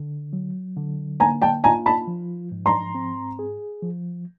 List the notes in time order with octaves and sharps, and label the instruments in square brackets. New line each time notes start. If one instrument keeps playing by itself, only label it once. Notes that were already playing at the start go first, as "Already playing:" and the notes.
Already playing: [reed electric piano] D3
F#3
D3
[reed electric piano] A#3 [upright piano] G#5 A#5
[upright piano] G5 A5
[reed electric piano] F4 [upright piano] G#5 A#5
[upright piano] A5 B5
[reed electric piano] F3
G#2
[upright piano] A#5 C6
[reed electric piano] C4
G#4
F3